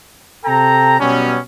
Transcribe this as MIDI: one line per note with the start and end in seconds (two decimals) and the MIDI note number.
0.45 0.99 48
0.45 0.99 69
0.45 0.99 79
0.45 0.99 82
1.00 1.38 47
1.00 1.38 54
1.00 1.38 55
1.00 1.38 59
1.00 1.38 61